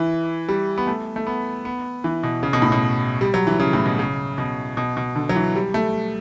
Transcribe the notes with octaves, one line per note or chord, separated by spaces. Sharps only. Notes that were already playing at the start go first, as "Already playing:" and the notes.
Already playing: E3
G3
B3
A3
A3
B3
B3
E3
B2
C#3
B2
A2
B2
G3
F#3
E3
C#3
A2
B2
C#3
B2
B2
B2
D3
F#3
E3
G3
A3